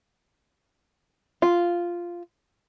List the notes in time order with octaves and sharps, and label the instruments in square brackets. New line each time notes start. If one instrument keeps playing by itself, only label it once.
[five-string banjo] F4